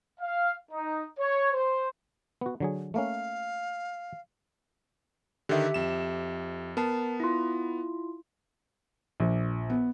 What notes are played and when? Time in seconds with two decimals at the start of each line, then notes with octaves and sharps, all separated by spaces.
0.20 F5
0.71 D#4
1.19 C#5
1.52 C5
2.41 B3 F#4
2.60 D3 F#3 G#4
2.94 A3 A#3 C#4 F5
5.49 D3 D#3 G4 E5
5.74 F2 E7
6.77 B3 A#4 A5 C7
7.20 E4 F4
9.20 A#1
9.70 B3